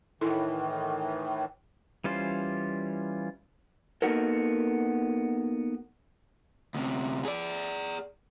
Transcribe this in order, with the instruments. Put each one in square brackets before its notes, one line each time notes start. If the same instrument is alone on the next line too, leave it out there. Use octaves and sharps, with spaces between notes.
[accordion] A2 D#3 E3 [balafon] E4 A4
[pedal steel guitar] E3 G3 C#4 F4 C5
[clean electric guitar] A#3 B3 D#4 F#4 A4 A#4
[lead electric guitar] D2 C3
G#4 D5